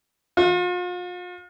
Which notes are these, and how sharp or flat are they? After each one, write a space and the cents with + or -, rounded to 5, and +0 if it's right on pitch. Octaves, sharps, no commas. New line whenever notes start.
F4 +40